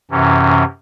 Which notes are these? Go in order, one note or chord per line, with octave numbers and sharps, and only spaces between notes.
F#2 C3 E3 C#4